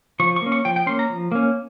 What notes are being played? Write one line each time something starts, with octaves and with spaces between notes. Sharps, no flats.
F3 C#6
C#6
A#3 C#4
C#6
F3 G5
G5
A#3 C#4 C6
A#5
F3
A#3 C#4